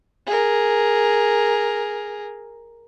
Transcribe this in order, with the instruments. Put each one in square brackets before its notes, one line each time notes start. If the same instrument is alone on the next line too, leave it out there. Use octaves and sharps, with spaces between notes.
[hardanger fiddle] G#4 A#4